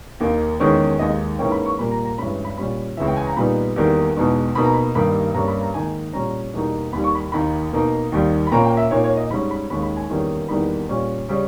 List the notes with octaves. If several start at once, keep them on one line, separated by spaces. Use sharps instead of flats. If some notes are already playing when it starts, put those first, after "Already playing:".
D#2 D#3 A#3 D#4
E2 D#3 G#3 C#4
D#2 D#3 G#3 D#5
G#2 E3 A#3 C#4 G5
B5
C#6
A#2 G3 A#3 B5
A#5
A#5
G2 E3 G#3 C#4 B5
B5
A#2 G3 C#4 B5
C#2 C#3 E3 E5
G5
G#5
A#5
A#2 G3 B3 D#4 B5
E2 D#3 G3 A#3
E2 B2 G#3 D#4
B2 A#3 D#4 B5
A#5
B5
G2 D#3 G3 A#3 D#4 B5
G2 G3 A#3 C#4 A#5
B5
A#5
G#2 D#3 A#3 D#4 G#5
A#2 G3 C#4 A#5
E2 B2 G3 A#3 D#4
D#2 D#3 G3 B5
C#6
B5
D#2 D#3 A#3 D#4 B5
B2 A#3 D#4
D#2 D#3 G3
B5
A#2 A#3 C#4 A#5
G5
E5
A#2 A#3 D#4 C#5
C#5
D#5
G#2 G3 C#4 B5
B5
D#2 D#3 G#3 C#4 B5
B5
G#5
E2 D#3 G3 A#3 C#4
E2 D#3 G3 A#3 D#4 B5
A#2 G3 C#4
C#3 G3 C#4